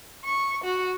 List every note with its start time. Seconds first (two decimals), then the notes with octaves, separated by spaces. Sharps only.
0.25 C#6
0.64 F#4